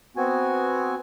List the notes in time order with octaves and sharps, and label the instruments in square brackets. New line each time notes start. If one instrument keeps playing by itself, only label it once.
[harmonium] B3 C4 F#4 G#5